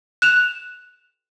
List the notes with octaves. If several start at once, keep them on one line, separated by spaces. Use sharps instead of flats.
F#6 E7 F7